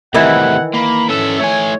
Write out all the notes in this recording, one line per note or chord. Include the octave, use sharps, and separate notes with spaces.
A2 C3 D#3 E3 E4 F#5
A#3 B5
C#4 A4 E5
A3 C#5 G#5